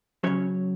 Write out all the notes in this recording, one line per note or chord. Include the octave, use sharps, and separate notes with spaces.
C#3 F#3 C#4 C#5